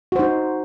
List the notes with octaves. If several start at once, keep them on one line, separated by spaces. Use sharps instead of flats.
D#4 F#4 C5